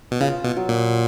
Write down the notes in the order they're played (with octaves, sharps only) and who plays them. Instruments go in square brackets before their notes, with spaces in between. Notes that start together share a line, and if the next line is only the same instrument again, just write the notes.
[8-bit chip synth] B2
[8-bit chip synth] C#3 [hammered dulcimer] F4
[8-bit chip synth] B2
[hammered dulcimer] F#3
[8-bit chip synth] A#2